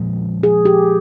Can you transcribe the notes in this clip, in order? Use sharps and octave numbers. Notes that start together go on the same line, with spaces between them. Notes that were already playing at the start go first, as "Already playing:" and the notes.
Already playing: A#2 F3 G#3 C#4
G#4
G4